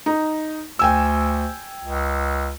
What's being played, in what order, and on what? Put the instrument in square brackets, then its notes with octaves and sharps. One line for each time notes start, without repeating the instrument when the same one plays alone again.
[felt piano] D#4
[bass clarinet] D2 [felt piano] G5 G#5 E6
[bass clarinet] C#2